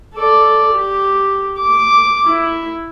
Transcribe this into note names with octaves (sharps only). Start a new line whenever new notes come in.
A4 D5
G4
D6
E4